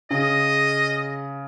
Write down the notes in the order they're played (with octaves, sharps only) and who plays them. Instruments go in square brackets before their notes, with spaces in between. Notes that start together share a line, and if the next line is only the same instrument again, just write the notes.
[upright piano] C#3 [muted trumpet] D#5